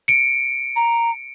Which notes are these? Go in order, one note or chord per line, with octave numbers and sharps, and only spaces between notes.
C#7 D7
A#5